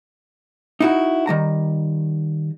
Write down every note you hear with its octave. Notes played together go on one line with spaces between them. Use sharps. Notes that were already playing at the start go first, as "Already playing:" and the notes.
D#4 E4 F#4
D#3 G3 A#5